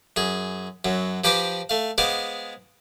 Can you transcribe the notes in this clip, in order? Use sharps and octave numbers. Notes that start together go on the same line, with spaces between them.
F#2 G#4
F#2 F#3
F3 G4 B4 C5 A#5 D6
A3 F5
G#3 B3 C5 F5 D6